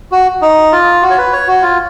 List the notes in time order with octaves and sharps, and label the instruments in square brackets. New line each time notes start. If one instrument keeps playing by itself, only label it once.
[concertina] F#4
D#4
F4
F#4
C#5
B4
C#5
F#4
F4